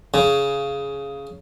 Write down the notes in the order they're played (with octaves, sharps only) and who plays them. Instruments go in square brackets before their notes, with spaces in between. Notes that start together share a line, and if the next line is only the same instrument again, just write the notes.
[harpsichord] C#3